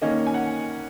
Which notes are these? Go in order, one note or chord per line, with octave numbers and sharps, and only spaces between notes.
D#3 A#3 C#4 D#5
G#5
F#5